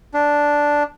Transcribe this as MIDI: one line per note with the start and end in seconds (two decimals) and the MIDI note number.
0.14 0.83 62